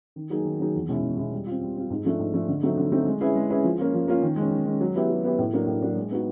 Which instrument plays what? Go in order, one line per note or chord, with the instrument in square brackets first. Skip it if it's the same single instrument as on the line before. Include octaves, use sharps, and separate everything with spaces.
[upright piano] D#3
F#3 A#3 D#4 G#4
D#3
F#3 A#3 D#4 G#4
E2
B2 G#3 C#4 E4
E2
B2 G#3 C#4 E4
G3
C4 F4
G3
C4 F4
G#2
F3 A3 D4
G#2
F3 A3 D4
D3
F#3 A3 C4 D#4
D3
F#3 A3 C4 D#4
G#3
C#4 E4 G#4 B4
G#3
C#4 E4 G#4 B4
F3
A#3 C#4 F4
F3
A#3 C#4 F4
D#3
G#3 C#4
D#3
G#3 C#4
F#3
B3 E4 G4
F#3
B3 E4 G4
A2
F#3 A#3 D4
A2
F#3 A#3 D4
G#3
B3 D#4 F#4